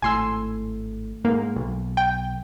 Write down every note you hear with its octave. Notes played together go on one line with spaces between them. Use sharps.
G#1 A2 G#5 C6 E6
G#2 A#3
B1
G5